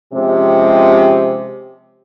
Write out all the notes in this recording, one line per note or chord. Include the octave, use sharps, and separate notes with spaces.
C3 F3 G#3 C4 C#4 G4